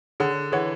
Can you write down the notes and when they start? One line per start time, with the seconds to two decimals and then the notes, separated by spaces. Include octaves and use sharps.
0.20 D3 G#4 C#5 F#5
0.52 E3 G#4 C#5 F#5